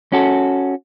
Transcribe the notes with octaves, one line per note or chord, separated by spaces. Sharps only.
C#4 F#4 A4